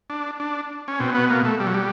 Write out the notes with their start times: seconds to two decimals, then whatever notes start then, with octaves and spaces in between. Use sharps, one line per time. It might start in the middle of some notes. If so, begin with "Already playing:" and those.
0.10 D4
0.40 D4
0.88 C#4
1.00 B2 C4
1.15 B3
1.30 A#3
1.45 A3
1.60 G3
1.67 F#3
1.74 G3